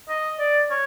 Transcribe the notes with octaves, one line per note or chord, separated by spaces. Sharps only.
D#5
D5
C#5